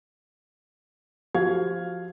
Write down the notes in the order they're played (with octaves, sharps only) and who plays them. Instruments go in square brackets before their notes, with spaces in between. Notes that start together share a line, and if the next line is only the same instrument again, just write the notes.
[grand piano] F3 F5 G#6 [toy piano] F#4 G4